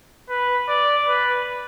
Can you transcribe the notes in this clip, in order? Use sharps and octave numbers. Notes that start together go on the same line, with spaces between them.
B4
D5
B4